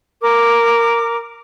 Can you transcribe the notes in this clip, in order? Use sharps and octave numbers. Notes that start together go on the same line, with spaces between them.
A#4 D6